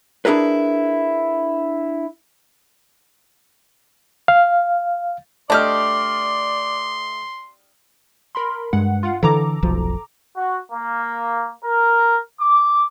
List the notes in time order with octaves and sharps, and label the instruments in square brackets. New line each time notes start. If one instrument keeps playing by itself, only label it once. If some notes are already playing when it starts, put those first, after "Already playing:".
[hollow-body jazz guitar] D4 E4 G#4 A#4 B4
[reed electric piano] F5
[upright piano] A3 D#5 F6 [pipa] D4 G4 [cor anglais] D5 [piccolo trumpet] C6
[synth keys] A#4 B5 C6
[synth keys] G2 F#5 [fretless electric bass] G#3
[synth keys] F4 F5 F#5
[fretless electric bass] D3 E3 [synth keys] A4 A#5 D6
[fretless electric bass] F1 B1 F3
[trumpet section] F#4
A#3
A#4
D6